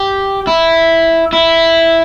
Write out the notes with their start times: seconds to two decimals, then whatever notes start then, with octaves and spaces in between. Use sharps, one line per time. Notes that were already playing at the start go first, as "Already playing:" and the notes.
Already playing: G4
0.47 E4
1.33 E4